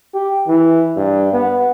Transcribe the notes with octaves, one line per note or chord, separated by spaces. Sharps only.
G4
E3
G2
B3